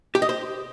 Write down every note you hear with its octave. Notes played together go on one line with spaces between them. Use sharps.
G4
D#5
C5